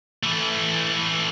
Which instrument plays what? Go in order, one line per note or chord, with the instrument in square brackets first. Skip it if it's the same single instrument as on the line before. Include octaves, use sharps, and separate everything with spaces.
[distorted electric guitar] E3 A3